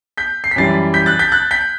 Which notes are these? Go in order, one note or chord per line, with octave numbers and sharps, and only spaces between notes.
G6 B6
C7
B6
F#2 E3 G3 A6 C7
G6 B6
F#6 A6
G6 B6
F#6 A6
G6 B6